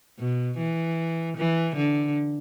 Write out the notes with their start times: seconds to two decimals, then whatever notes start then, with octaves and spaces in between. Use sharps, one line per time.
0.19 B2
0.58 E3
1.37 E3
1.76 D3